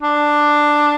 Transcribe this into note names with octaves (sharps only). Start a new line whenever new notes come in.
D4